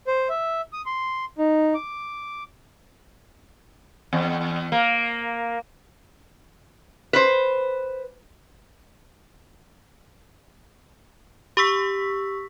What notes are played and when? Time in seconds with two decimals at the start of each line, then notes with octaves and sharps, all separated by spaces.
0.07 C5
0.29 E5
0.73 D#6
0.86 C6
1.38 D#4
1.74 D6
4.13 E2
4.72 A#3
7.13 B4 C5
11.57 G4 C#6 E6 B6